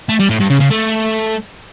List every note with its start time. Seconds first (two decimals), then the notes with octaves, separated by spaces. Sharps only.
0.09 A3
0.20 G3
0.30 A2
0.40 G2
0.49 C#3
0.60 C#3
0.70 A3